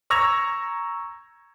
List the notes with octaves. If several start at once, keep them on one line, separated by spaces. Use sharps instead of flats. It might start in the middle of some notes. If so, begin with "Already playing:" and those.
A#5 C#6 E6 G#6 A#6 F7